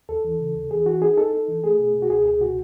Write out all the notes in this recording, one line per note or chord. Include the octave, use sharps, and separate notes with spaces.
D#2 A4
E3
C#3
D#2
E3 G#4
E3 F#4
D#4 G#4
D#4 A4
D#4
E3
A3 G#4
B2
B2
F#4
C#2 G#4
C#2 G#4
B2 F#4